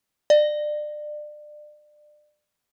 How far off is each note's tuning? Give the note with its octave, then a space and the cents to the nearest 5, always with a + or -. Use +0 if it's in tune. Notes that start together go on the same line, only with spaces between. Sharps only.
D5 +30